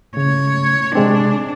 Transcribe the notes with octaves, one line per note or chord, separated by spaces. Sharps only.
C#3 C#5
C3 G#3 C4 D4